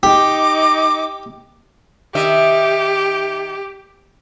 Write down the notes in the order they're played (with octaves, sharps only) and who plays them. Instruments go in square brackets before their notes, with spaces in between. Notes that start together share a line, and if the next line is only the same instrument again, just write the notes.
[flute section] D#4 D6 [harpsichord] G4
[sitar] D#3 D#5 E5 [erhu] G4